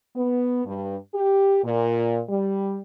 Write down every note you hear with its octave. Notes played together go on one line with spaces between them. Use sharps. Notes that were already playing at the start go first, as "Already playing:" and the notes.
B3
G2
G4
A#2
G3